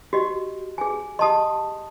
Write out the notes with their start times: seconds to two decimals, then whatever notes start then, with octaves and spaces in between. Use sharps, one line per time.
0.13 F#4 G4 D#5
0.78 G#4 G#5
1.19 G4 D#5 A5 C6 D#6